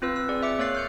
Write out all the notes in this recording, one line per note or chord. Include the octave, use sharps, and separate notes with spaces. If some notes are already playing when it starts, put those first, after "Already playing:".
C4 F4 B4 E6
E6
C4 G#4 D5
E5 D6 C#7
A#3 C#5 F#6 A6 C7
F6 G6 C#7